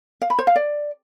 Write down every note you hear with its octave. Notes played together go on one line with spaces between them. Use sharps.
F5
B5
C5
F5
D5